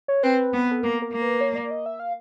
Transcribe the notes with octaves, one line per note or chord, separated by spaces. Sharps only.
C#5
C4 B4
B3
A4
A#3 A#4
A#4
A#3
B4
C#5
D5
D#5
E5
F5